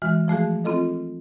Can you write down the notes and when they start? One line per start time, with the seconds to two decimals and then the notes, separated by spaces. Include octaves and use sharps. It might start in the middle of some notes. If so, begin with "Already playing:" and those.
0.02 E3 G#3 F#4 F6
0.28 F3 A3 F#4 G#4
0.64 C4 F4 A4 D#5